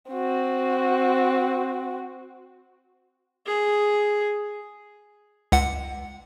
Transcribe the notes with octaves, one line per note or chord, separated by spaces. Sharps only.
C4 F#4
G#4
C#2 F#5